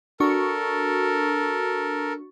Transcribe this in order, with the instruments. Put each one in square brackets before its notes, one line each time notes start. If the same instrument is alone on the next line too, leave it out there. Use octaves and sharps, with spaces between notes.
[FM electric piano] D4 F#4 C#6 [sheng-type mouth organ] A4 A#4